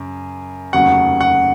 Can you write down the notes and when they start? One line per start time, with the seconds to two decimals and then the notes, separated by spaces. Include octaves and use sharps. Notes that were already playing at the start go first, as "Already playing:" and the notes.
Already playing: F#2 C#3
0.73 F1 D#2 C#3 F#3 F#5
1.21 F#5